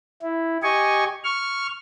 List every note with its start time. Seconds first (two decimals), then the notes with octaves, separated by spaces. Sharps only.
0.22 E4
0.63 G4 D#5 G#5 C#6
1.24 C#6 F6